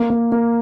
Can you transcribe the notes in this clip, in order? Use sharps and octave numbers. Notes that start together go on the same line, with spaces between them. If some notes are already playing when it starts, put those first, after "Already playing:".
Already playing: A#3
A#3
A#3